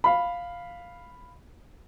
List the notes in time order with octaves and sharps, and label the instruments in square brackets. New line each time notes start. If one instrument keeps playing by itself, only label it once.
[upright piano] F5 B5